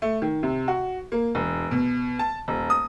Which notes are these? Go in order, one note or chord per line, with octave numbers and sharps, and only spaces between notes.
A3
D#3
C3
F#4
A#3
E1
B2
A5
D#1
D#6